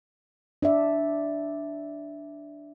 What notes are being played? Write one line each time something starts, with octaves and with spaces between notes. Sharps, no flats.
D4 D5 E5